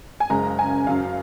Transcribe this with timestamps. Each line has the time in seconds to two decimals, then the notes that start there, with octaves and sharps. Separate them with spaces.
0.20 G#5
0.30 F#1 F#2 C#3 G#3 A#5
0.59 G#5
0.87 F#1 F#2 C#3 F#3 F5